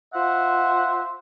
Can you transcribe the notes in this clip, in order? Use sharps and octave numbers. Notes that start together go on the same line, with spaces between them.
F4 C5 E5 F#5